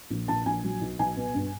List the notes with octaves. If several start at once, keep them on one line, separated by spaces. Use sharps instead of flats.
A#1
A#1 A5
A#1 G#5
F#3
B1
B1 G#5
B2
G2